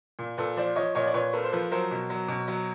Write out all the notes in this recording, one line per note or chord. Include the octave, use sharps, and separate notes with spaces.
A#2
A#2 A4 B4
F3 C5 D5
F3 C#5 D#5
A#2 C#5 D#5
D5
A#2 B4 C#5
A#3 A4 B4
C5
F3 A4 B4
F#3 A#4 C5
B2
F#3
B2
F#3